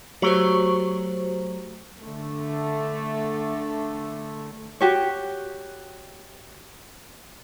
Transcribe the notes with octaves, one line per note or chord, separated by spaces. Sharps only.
F#3 A3 F#4 G4 C5 C#5
D3 A3
F#4 G4 C#5